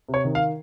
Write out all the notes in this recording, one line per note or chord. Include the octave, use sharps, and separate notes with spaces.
C3
C#5
D#3
F5